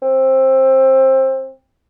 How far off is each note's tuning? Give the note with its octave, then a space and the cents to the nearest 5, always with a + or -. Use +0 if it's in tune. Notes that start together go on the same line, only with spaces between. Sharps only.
C4 +20